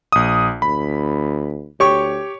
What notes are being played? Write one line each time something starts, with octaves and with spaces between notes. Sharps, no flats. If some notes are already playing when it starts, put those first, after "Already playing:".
A#1 D#6
D2 B5
D2 G4 C#5 C#6